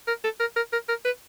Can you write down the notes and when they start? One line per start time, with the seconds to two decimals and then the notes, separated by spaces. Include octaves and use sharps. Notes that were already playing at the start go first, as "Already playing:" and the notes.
0.07 A#4
0.24 A4
0.40 A#4
0.56 A#4
0.72 A#4
0.88 A#4
1.05 B4